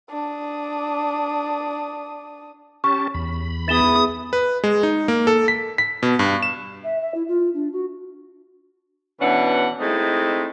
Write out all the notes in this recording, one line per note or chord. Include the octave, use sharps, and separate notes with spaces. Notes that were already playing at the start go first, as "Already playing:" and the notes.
D4 D#6
C#4 G4 A5 C#6
E2 B5
B3 E4 G#4 D#6 A6 E7 G7
B4
G#3
D#4
A#3
A4
B6
B6
B2
G2
E7
E5
E5
E4
F4
D4
F#4
B2 E3 C#4 D4 F#5
G#3 A3 C4 D#4 E4